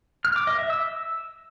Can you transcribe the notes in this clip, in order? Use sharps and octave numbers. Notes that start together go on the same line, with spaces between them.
F6
D6
D#5
E5
E6